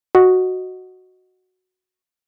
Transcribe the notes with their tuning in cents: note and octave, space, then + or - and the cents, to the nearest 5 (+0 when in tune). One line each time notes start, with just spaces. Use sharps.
F#4 +0 D#5 +0